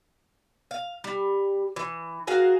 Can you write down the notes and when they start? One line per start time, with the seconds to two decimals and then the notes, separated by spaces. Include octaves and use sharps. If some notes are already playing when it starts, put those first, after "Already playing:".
0.71 F5
1.04 G3
1.76 E3
2.27 F#4 G#4 A#4 F5